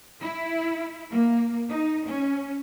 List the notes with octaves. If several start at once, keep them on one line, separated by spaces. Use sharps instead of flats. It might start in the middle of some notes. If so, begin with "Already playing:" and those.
E4
A#3
D#4
C#4